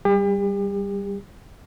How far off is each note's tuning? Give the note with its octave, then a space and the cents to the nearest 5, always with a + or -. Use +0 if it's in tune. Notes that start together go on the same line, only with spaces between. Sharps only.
G3 +0 G4 +40